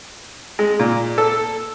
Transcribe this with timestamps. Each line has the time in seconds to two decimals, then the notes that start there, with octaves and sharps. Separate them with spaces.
0.59 G#3
0.80 A#2
1.18 A4